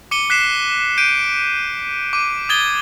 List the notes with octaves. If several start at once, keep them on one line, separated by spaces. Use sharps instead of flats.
D6 C#7 D#7 G7
F#6 B6 C7 E7
G6 D7 D#7
D6 D#7
D#6 G#6 A6 G7